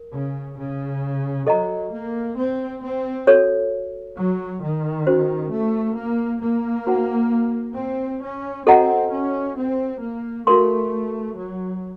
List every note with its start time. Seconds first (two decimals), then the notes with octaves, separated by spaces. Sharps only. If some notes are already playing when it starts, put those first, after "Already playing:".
Already playing: A#4
0.12 C#3
0.56 C#3
1.47 F#3 A4 D#5 A#5
1.91 A#3
2.37 C4
2.82 C4
3.27 F#4 A4 C#5
4.17 F#3
4.62 D#3
5.07 C#4 F#4 C5
5.52 A3
5.96 A#3
6.42 A#3
6.87 D#4 F#4 C5 F#5 A#5
7.76 C4
8.22 C#4
8.67 C4 F#4 A4 D#5 F#5 A#5
9.12 C#4
9.57 C4
10.01 A#3
10.47 A3 F#4 A#4 F5 C6
11.37 F#3